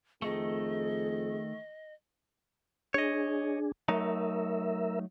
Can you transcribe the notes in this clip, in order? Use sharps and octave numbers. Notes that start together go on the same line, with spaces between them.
F2 D#3 A3 G#4 D#5
D4 G#4 C#5 D#5
F#3 A3 D#4 A#4 E5